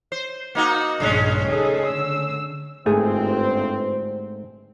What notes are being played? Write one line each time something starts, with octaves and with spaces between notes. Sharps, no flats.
C5
A#3 D#4 F#4
A#1 G2 A#2 C#3 G#3 C#4
D#4 G#4 A4
D3 E6
G1 G#2 A3 C4 G#4 C5